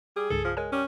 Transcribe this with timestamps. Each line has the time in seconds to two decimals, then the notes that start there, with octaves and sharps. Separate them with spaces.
0.16 G3 G#4
0.30 C2 G2 C#3 A4
0.44 F3
0.57 G#3 A#4 C#5 G#5
0.72 G3 C#4